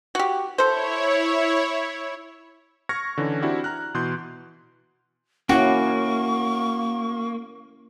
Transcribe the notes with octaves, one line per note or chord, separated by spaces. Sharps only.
F#4 G4
E4 A4 C5 C#5
C#6 F6 G#6 A#6 C#7
D3 E3 C#4 D#4
C4 D4 E4 F#4 G4
A#5 F6 F#6
B2 E3 C6 F#6 G6
A#3 C#4 E4 F#4 C#6